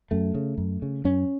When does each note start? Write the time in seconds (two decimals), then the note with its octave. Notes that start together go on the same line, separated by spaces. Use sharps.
0.11 F#2 A3
0.35 C#3
0.58 F#2
0.82 C#3
1.04 F#2 C#4